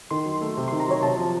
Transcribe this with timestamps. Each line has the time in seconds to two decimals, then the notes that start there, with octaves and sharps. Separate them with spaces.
0.11 D#3 C6
0.26 F#3
0.41 A3
0.57 C3
0.68 C6
0.72 D#3
0.80 A#5
0.87 F#3 C#5
1.02 C3 A5
1.17 F3